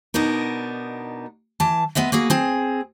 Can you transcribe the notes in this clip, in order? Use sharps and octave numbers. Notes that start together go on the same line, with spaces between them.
B2 B3 D4 D#4 A#4
E3 A5
G#3 B3 B4 D#5 E5
A#3 F#4 G#4 B4
C4 G#4